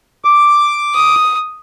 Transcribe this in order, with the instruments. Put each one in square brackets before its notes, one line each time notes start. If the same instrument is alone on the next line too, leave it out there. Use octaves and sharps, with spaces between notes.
[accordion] D6
[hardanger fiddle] D#6